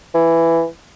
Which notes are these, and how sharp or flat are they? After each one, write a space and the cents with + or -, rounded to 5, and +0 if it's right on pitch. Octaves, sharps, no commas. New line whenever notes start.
E3 +10